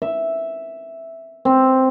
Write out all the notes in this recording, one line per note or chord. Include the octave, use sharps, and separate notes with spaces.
E5
C4